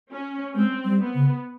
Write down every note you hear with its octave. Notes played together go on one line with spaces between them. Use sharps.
C#4
G#3 C4
G3
B3
C#3